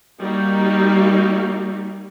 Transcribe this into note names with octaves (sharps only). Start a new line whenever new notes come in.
G3 A#3 D#4 F#4